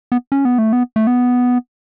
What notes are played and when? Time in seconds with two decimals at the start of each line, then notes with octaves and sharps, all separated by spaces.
0.12 B3
0.32 C#4
0.45 B3
0.58 A3
0.73 B3
0.96 A3
1.07 B3